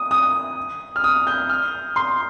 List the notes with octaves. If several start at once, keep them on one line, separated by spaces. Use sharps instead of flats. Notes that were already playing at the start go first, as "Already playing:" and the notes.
Already playing: D#6
D#6
F6
D#6
G6
F6
C6